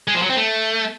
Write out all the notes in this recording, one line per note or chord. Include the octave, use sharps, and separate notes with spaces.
G#3
F3
F#3
C4
A3